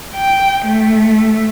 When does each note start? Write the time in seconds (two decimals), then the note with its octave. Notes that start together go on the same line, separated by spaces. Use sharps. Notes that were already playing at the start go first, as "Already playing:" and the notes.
0.16 G5
0.66 A3